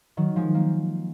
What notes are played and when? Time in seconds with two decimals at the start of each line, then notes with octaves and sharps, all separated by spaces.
0.17 D#3 F#3
0.36 F3 G#3
0.55 A#3